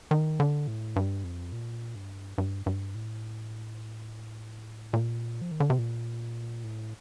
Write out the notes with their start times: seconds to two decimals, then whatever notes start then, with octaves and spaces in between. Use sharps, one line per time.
0.11 D#3
0.40 D3
0.67 A2
0.96 G2
1.24 F2
1.52 A#2
1.95 G2
2.38 G2
2.66 G2
2.95 A2
4.93 A#2
5.41 F3
5.51 D#3
5.60 D3
5.70 C3
5.78 A#2
6.64 A2